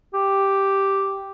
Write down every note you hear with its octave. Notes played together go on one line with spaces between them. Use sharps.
G4